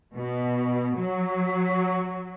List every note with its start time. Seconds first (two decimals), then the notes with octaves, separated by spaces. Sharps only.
0.14 B2
0.97 F#3